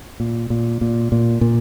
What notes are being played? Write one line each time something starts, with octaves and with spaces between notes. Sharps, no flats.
A#2
A#2
A#2
A#2
A#2